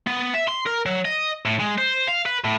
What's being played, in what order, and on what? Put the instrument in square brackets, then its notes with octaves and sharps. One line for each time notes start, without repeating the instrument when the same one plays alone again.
[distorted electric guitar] B3
E5
C6
A#4
F#3
D#5
A2
G#3
C5
F5
B4
A2